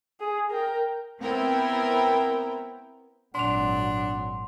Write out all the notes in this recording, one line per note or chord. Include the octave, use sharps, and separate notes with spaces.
G#4
A#4 G5
B3 C4 E4 A#4 G5
G#1 A#2 F#3 D4 F#5 C6 F7